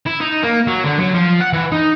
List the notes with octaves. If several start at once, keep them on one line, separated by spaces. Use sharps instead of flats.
E4
D#4
A#3
F#3
D3
F#3
F3
F#5
E3
D#4